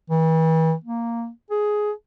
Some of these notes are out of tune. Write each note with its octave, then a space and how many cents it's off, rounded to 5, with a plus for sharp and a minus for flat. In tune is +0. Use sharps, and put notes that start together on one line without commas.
E3 -35
A#3 -5
G#4 +10